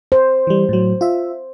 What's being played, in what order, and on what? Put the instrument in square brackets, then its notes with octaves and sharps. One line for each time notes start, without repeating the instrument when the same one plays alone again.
[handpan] C5
[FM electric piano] E3 G3
A2 F#3
F4 E5